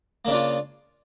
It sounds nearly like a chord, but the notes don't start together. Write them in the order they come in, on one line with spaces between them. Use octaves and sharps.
A#3 C#3 D4 F4